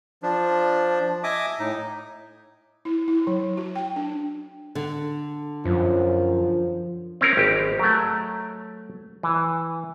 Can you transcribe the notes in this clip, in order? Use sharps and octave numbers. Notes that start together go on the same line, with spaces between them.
F3 D4
D#5 E5 G#5 D6 D#6
A2 D#4
E4
E4
F#3
F#4
G5
D4
D3
F#2 F3
C4 C#4 A#4
G#1 G4
F#3 A3
E3